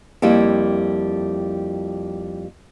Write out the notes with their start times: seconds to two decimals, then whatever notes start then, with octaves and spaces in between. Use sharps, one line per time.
0.22 F2 G3 A#3 E4